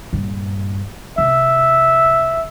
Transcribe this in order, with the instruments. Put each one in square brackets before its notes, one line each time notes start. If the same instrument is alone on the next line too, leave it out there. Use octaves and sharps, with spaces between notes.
[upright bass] G2 A#2
[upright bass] C3 [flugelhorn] E5